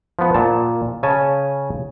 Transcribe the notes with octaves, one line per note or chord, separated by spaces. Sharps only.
F3 B3
A#2 A5
C#3 C#4 G#5 A5